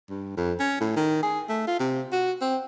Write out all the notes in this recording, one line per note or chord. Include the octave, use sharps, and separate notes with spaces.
G2
F2
C#4
A2
D#3
G#4
A3
F4
C3
F#4
C4